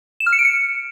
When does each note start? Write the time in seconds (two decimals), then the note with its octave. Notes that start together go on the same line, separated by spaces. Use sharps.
0.20 E7
0.26 F6
0.33 C#7
0.39 D7
0.45 C#7